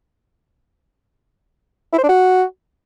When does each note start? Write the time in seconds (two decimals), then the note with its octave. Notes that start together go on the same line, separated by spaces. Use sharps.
1.93 E4
1.98 C5
2.03 D4
2.09 F#4